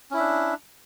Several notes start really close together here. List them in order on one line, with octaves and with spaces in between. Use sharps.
C#4 E4 E5 D4